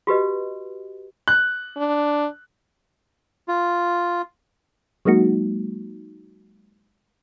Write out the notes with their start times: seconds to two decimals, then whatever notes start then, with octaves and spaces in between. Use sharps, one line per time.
0.07 F#4 G4 B4 D#5
1.28 F#6
1.77 D4
3.48 F4
5.05 F#3 G#3 A#3 D#4 F#4